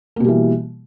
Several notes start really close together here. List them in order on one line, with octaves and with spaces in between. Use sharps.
A#3 B2 G3 E3